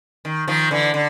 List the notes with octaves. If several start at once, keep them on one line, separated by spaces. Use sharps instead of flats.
D#3
D#3 F3
D3 E3
D3